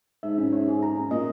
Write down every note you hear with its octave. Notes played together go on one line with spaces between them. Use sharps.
G#2 E5
C#4
C#5
G#4
A#5
C#4
A#2 D#5